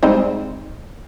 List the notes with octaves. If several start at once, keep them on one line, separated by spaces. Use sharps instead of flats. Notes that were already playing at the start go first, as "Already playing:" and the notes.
G3 G#3 C4 D#4 C5